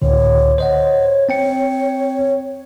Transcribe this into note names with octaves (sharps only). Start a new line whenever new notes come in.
C#2 A2 D3 C#5
C5 C#5 D#5 F#5
C4 C#5 G5 C#7